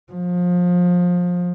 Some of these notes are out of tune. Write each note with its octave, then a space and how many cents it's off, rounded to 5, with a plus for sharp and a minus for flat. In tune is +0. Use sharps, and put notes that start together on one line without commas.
F3 +25